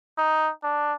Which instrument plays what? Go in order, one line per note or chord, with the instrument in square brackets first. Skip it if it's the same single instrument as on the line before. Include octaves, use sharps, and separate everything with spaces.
[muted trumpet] D#4
D4